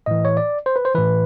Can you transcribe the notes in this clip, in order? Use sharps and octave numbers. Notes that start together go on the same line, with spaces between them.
A2 E3 D#5
C#5
D5
C5
B4
C5
A2 E3 B4